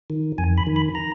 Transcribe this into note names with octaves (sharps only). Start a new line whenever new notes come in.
D#3
F2 G#5
B5
D#3
B5
A#5